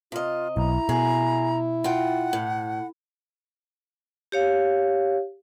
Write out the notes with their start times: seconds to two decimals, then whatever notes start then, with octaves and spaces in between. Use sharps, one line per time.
0.12 C3 F4 D#5
0.57 B1 E4 A#5
0.89 B2 G#4
1.84 F4 F#5 G5
2.33 A2
4.32 G4 C#5 F5